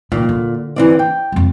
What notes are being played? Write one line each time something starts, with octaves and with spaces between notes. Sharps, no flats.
A#2 D#3
D3
E3 C4 D5
G5
F2 G#3